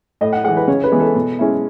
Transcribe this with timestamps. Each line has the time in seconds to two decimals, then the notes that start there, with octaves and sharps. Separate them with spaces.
0.21 A2 D#5
0.33 F#5
0.44 E3 G#3 F#5
0.57 B4
0.68 C#3 C#5
0.84 B4
0.92 E3 G#3 B3
1.00 A4
1.15 B2
1.39 G#3 C#4 E4